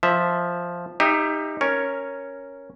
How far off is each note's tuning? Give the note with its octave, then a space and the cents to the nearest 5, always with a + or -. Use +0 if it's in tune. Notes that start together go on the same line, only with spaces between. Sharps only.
F3 +0 E5 -10
D#4 +0 G4 +25 E5 +20
C#4 +0 A#4 +0 C#5 +0